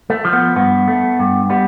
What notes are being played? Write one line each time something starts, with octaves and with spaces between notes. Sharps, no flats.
A3
F3
B3
G2 B3
A3
G2
G3 B3